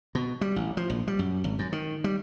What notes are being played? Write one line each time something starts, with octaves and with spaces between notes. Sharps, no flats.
B2
G3
A1
F3
A#1
G3
F#2
G#1
F#2
D#3
G3